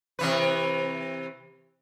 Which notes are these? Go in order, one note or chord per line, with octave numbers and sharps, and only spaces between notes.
C3 E3 B4